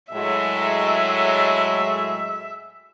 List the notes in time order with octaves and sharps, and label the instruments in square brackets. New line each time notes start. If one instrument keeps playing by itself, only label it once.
[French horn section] A2 F#3 G#3 [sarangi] E5